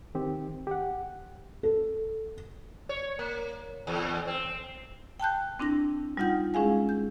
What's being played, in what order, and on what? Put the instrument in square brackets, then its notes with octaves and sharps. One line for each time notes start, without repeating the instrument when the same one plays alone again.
[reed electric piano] D#3 C4 G4
G4 F#5
[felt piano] A4
[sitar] C#5
A#3
E2
C4
[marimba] G5 A5 F#6 G6
C4 D4 E4 A#6
G3 D#4 F4 F#5 G6
G#3 C#4 E4 G#4 F5 G#5
G6